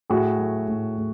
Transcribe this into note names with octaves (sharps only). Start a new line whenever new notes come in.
A2 F#4 G#4
A3
A2
A2